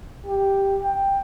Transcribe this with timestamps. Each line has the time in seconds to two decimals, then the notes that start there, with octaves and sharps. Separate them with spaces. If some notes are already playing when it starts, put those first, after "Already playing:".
0.26 G4
0.83 G5